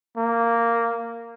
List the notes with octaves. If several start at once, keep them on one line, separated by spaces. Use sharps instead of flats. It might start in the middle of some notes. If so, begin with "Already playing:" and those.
A#3